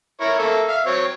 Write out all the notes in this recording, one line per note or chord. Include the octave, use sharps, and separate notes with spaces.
E4 A#4 C#5
A#3 A4 E5
E5 F5
F#3 C4 C#5